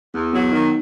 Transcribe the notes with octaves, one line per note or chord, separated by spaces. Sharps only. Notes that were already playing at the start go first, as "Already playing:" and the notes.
E2 B3
F#3 B3
D#3 D#4